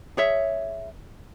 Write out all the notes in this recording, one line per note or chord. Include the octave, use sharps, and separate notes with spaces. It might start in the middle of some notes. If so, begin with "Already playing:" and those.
G#4 C#5 E5